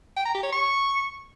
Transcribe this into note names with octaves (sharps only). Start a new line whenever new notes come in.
G5
A#5
G4
C#5
C#6